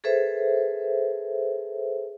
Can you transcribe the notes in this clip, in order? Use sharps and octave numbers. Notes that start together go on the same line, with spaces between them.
G#4 A4 B4 C5 E5